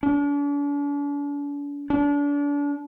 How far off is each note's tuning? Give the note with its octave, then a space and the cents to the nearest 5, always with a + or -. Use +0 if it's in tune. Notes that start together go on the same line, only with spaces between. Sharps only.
D4 -40
D4 -35